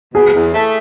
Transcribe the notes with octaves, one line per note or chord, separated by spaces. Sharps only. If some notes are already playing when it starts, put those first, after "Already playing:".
B2 G#4
E2
A3